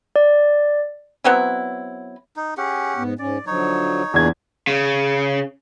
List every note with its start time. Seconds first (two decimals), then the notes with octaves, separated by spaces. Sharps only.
0.16 D5
1.24 F#3 B3 C4 E4
2.36 D#4
2.57 C#4 G4 G#4 F#5
2.97 G#2 B3
3.19 G#2 C#4 D5
3.47 D3 F3 F#3 D#4 C#5
4.14 E2 A#2 D4 G#4 G#6
4.67 C#3